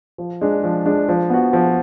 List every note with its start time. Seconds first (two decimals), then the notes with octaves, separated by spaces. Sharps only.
0.18 F3
0.41 G#3 D4
0.64 F3
0.86 G#3 D4
1.09 F3
1.30 B3 F#4
1.53 F3